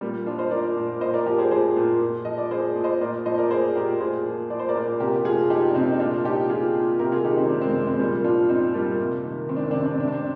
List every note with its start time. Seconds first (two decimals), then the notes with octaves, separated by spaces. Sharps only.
0.01 A#2 G3 A#3
0.26 F3 D4 F4
0.39 C5 D#5
0.51 F3 A#4 D5
0.76 A#2
1.01 A#2 C5 D#5
1.14 A#4 D5
1.26 F3 G4 A#4
1.39 G#4 C5
1.51 F3 G#4 C5
1.76 A#2
2.01 A#2
2.25 F3 D#5
2.38 D5
2.51 F3 G#4 C5
2.75 A#2
2.84 C5 D#5
3.01 A#2 A#4 D5
3.26 F3 C5 D#5
3.38 A#4 D5
3.51 F3 G#4 C5
3.75 A#2 G4 A#4
4.01 A#2 G#4 C5
4.25 F3
4.50 F3 D5
4.59 C5
4.68 A#4 D5
4.75 A#2
5.00 C3 G4 A#4
5.16 G4
5.25 F3 F4 G#4
5.50 F3 D#4 G4
5.70 D4
5.75 C3 C4 D#4
5.92 D#4
6.00 A#2 D4 F4
6.24 F3 D#4 G4
6.49 F3 F4 G#4
6.75 A#2
6.99 C3 G4 A#4
7.12 F4 G#4
7.24 D#3 D#4 G4
7.37 C4 D#4
7.49 D#3 A#3 D4
7.61 G#3 C4
7.74 C3 G#3
7.87 G#3 C4
7.99 A#2 G3 A#3
8.24 F3 D4 F4
8.49 F3 C4 D#4
8.74 A#2 G3 A#3
8.99 C3
9.24 D#3
9.49 D#3 C4
9.57 D4
9.64 C4
9.71 D4
9.74 C3 C4
9.86 D4
9.93 C4
9.99 C3 D4
10.07 C4
10.14 D4